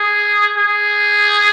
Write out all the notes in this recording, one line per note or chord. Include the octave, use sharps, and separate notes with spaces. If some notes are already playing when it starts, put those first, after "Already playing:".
Already playing: G#4
G#4